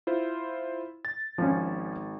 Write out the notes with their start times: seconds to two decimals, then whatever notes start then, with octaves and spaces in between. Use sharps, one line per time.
0.07 E4 F4 C5
1.05 A6
1.38 G#1 F3 C#4